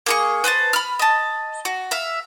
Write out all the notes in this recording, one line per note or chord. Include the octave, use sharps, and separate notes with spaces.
A#3 G#4 C#6
B4 C5 F#5 A5
B5 F6
D#5 A5
F#4
E5 F5